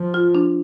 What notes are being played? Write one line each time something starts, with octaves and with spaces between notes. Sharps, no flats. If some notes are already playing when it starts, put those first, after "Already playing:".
Already playing: F3
F4
D4